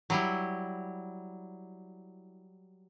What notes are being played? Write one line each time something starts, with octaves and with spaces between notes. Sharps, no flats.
F#3 G3 E4